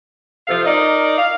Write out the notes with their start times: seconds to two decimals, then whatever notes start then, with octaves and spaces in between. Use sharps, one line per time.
0.48 C3 F3 F4 A4 F5
0.65 D#4 A#4 D5 D#5
1.18 F5